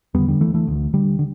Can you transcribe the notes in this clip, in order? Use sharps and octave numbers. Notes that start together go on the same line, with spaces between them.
E2 D3 G3 B3
D3 G3
E3 A3
E3 A3
D2 D3
D3 G3
D3